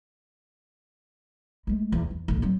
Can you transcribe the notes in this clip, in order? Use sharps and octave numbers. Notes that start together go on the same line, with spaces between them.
G#3 A3
E2
E2
A1 D2
F#3 C4